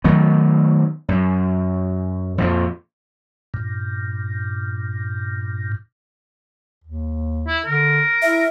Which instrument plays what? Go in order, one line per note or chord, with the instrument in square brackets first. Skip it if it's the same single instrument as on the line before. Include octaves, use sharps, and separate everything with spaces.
[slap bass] D#3 F#3 A3 B3
F#2
F2 A#2 F3
[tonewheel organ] G2 A#2
[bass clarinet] D#2
[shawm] E4
[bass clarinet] D3 [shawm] A#4
[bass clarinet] E4 [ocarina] E5